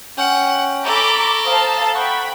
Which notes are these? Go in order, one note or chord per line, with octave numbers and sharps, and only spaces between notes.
C#4 F#5 G5
A4 A#5 B5 C#6 D6
C5 F5 A5 A#5 D#6
F#5 G5 B5 C#6